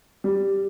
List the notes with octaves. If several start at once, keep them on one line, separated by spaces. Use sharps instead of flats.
G3